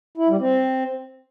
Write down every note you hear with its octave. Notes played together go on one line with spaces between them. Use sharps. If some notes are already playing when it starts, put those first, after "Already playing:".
E4
G3
C4